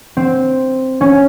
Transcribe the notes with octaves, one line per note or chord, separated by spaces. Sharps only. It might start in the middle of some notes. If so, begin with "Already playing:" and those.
C4
C#4